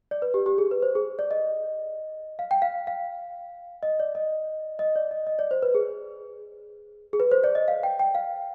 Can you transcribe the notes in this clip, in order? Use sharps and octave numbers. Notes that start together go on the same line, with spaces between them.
D5
B4
G4
G4
G#4
B4
C5
G#4
D5
D#5
F5
G5
F5
F5
D#5
D5
D#5
D#5
D5
D#5
D#5
D5
C5
B4
G#4
G#4
B4
C5
D5
D#5
F5
G5
G5
F5